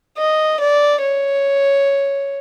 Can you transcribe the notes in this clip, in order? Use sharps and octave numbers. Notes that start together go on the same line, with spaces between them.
D#5
D5
C#5